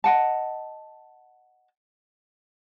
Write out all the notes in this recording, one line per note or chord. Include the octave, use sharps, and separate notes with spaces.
D#5 F#5 A5